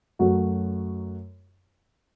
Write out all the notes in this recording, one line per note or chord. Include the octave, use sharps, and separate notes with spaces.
F#2 F#3 A3 F#4